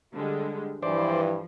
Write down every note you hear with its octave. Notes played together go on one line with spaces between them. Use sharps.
D3 G3 G#3
G2 E3 F3 C5 D5